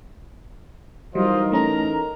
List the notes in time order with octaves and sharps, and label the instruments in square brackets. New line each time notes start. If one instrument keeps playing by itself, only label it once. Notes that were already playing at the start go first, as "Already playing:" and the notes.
[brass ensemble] E3 D#4 A#4 [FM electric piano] F#3 G3 [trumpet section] F4 C5 D#5
[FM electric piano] A3 C#4 A4 [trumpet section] A#5